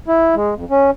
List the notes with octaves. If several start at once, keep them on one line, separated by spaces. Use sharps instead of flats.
E4
G#3
F2
C#4